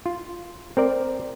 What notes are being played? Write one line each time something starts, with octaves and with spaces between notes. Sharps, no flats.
F4
C4 A#4 D5